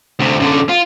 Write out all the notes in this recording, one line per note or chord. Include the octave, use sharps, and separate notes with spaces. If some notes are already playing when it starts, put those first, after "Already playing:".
D2 C3
F#2 D3
F4